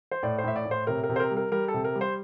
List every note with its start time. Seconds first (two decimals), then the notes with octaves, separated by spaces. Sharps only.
0.11 C5
0.23 A2 D5
0.38 C5
0.44 A2 E5
0.56 D5
0.65 A2
0.71 C5
0.87 C3 A#4
1.04 A#4
1.09 C3
1.16 C5
1.20 A#4
1.31 G3
1.37 A#4
1.52 G3 A#4
1.68 A4
1.74 C3
1.84 A#4
1.95 G3
2.01 C5